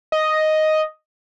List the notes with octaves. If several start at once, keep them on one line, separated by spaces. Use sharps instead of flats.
D#5